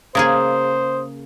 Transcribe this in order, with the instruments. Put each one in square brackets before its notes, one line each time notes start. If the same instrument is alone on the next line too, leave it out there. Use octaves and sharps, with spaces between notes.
[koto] C#3 A#3 G#4 [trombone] C5 [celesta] D#6